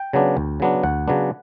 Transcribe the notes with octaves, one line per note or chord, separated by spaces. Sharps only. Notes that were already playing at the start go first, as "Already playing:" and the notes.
Already playing: G5
C#3 F#3 B3 D4
D2
C#3 F#3 B3 D4
D2 F#5
C#3 F#3 B3 D4